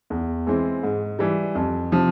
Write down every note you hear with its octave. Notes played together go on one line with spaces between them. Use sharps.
E2
E3 G#3 C4
G#2
E3 G3
F2
C3 F3